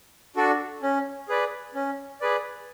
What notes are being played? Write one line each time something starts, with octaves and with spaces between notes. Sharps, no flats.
D4 F#4 A4 D5
C#4
G#4 B4 D5
C#4
G#4 B4 D5